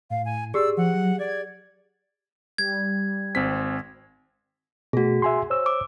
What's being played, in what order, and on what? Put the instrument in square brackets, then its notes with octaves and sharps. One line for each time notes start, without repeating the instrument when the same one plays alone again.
[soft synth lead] A2 [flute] F5
[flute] G#5
[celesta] G4 G#4 [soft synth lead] D5 [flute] E6
[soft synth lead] F3 [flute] F#5
[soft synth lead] F#3
[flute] D5 [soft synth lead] G#6
[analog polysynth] G3 [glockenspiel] G#6
[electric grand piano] G#1 C4 B6
[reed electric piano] B2 A3 [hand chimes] F#4 G#4
[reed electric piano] E5 G#5 C6
C5 C#5 E6
[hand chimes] D6